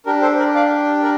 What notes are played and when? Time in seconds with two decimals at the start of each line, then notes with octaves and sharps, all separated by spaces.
0.06 D4 G4 A#4
0.22 A4 C5
0.38 A#4 D5
0.55 D5 F5
1.03 A#4 D5